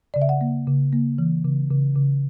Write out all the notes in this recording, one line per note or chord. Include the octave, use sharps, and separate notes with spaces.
C#3 D5
E5
F#5
A#3
C#3
A#3
E3
C#3
C#3
C#3